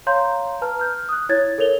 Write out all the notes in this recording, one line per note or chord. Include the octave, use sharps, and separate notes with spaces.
C#5 F5 A#5 C6 G6
B4 A5 A#5 F6
F6 G6
D#6 F#6
E4 C#5 G#6 A6
A4 A#4 C#5 F7 G7